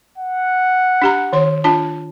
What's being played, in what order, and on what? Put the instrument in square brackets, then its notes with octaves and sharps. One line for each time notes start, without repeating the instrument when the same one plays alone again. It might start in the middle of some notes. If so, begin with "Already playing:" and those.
[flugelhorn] F#5
[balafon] D4 G4 A#5
D#3 C#5 C6
D4 F4 A5